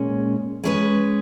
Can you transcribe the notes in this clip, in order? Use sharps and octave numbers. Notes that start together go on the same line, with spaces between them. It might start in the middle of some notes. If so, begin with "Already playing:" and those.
Already playing: A#2 G#3 C#4
G#3 C#4 G#4 B4